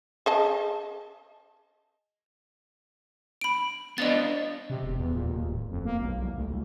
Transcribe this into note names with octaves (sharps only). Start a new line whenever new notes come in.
G#4 D#5 A5
B5 D7
B3 D4 D#5 A6
C3
E1
E2
A#2
D#2
D1
F2
A#3
B1
C2
D2
C2